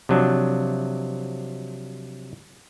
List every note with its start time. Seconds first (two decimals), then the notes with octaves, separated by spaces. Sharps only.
0.09 C3 F3 F#3 D4